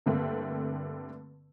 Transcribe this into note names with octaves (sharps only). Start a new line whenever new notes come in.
G2 D3 A3 A#3 C4